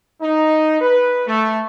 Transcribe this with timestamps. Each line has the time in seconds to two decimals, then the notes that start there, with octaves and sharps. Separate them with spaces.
0.21 D#4
0.80 B4
1.26 A3